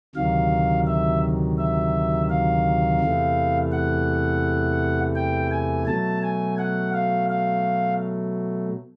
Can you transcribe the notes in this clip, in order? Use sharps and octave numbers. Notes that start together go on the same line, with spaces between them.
D2 C3 D#3 F#3 F5
E5
E5
F5
E2 C3 E3 A3
F#5
G5
G#5
B2 F#3 A3 A5
G#5
F#5
F5
F5